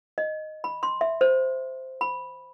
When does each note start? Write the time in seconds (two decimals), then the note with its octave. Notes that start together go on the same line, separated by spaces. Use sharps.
0.18 D#5
0.64 B5
0.83 C6
1.01 E5
1.21 C5
2.01 B5